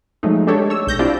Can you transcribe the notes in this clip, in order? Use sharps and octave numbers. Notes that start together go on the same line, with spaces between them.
F3 F#3 G#3 A3 D#4
G#3 D4 G4 A4 C#5
C#5 E6
B1 G6 A#6
C4 D4 E4 F4 G4 D5